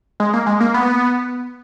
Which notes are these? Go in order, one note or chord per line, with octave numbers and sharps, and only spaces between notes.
G#3
A#3
G#3
A#3
B3